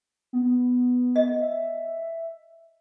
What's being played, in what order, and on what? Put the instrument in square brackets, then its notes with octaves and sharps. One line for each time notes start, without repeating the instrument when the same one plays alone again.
[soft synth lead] B3
[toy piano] D#5
[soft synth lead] E5